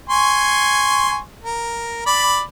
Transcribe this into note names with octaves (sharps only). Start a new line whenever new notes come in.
G#5 C6 C#6
A#4
D5 B5